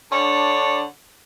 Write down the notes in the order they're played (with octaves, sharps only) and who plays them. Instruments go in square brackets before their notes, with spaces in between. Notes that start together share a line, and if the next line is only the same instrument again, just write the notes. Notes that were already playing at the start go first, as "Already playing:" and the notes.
[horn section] D3 D4 C#5 F#5 A5